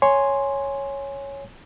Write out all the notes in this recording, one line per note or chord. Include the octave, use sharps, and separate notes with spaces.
C#5 G#5 C6